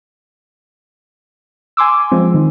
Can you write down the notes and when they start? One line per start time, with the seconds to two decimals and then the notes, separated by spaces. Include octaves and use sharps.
1.77 G#5 C6 D6 E6
2.12 F3 G#3 C4
2.34 D#3